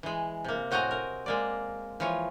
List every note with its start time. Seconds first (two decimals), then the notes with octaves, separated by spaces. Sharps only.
0.03 E3 G#3
0.44 C3 A#3
0.71 A2 C4 F#4 D#5 G#5 A#5
0.91 A#4
1.26 G#3 A#3 D5
2.00 E3 F3 F4 C#5